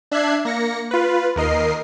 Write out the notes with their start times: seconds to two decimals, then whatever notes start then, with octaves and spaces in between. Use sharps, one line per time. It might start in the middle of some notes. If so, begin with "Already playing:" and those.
0.12 D4 E5 F#6 G#6 C7
0.45 A#3 A#6 C#7
0.91 F4 B4
1.36 D#2 A#4 D#5 C7